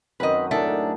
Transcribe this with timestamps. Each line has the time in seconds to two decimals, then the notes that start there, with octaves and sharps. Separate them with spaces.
0.20 F#2 D#3 C4 B4 D#5
0.51 A2 D4 G#4 A4 E5
0.68 D#4